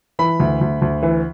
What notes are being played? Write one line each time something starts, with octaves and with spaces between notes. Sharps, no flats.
E3 B5
D2
D2
D2
E3